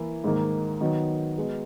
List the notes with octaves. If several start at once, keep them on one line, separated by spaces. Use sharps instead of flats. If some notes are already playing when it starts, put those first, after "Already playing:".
Already playing: E3 A#3 E4
G#2 D#3 A#3
D#3 F#3 B3
G#3 B3 F#4